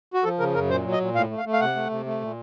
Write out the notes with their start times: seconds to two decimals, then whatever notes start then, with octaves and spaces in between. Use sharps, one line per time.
0.14 F#4
0.24 F3 A4
0.39 C#3 A#4
0.55 F#2 A#4
0.70 A#2 C5
0.85 F#3
0.92 D#5
1.00 A#2
1.15 A2 F5
1.31 A3
1.38 F5
1.45 A3
1.53 F5
1.61 C3 F#5
1.76 A3
1.90 C3
2.06 A3
2.21 A#2